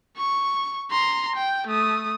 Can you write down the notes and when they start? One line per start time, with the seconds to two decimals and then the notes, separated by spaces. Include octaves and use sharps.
0.17 C#6
0.91 A#5 C6
1.36 G5
1.67 A3 D#6